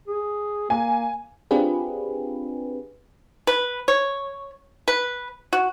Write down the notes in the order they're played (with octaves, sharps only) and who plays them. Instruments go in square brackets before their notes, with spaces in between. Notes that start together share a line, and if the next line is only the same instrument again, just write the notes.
[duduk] G#4
[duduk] A#3 [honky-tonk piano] G#5
[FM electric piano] C4 D4 F4 G4 G#4 B4
[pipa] B4
C#5
B4
F#4